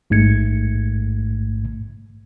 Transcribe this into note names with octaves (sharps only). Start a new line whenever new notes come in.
A1 G#2 A3 G#6 C#7